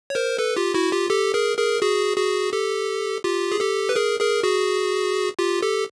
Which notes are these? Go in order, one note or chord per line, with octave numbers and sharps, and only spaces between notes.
C#5
A#4 C5
A4 B4
F4 G4
E4 F#4
F4 G4
G4 A4
G#4 A#4
G#4 A#4
F#4 G#4
F#4 G#4
G4 A4
F4 G4
G#4
G4 A4
B4
G#4 A#4
G#4 A#4
F#4 G#4
F4 G4
G4 A4